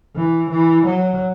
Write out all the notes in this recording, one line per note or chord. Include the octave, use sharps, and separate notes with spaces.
E3
E3
F#3